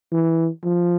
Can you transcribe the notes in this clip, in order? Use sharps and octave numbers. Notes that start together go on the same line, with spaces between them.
E3
F3